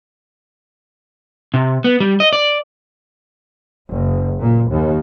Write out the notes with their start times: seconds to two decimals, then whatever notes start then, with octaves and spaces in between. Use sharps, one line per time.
1.54 C3
1.84 B3
2.00 G3
2.20 D#5
2.33 D5
3.89 F#1
4.41 A#2
4.71 D#2